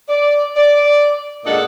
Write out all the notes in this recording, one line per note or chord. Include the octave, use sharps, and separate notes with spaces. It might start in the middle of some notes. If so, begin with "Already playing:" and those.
D5
D5
A#2 G#3 D4 A4 D#5 F#5